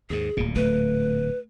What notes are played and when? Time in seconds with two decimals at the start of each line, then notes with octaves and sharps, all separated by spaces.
0.10 D#2 G#2 G#4
0.37 D1 D2 A#2 A#3
0.56 A3 B4